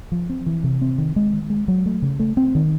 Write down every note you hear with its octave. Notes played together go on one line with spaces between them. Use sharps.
F3
C4
E3
C3
C4
D#3
G#3
D#3
G#3
F#3
A3
C#3
A3
C4
D#3